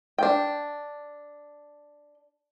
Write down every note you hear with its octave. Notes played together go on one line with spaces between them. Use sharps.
D4 G5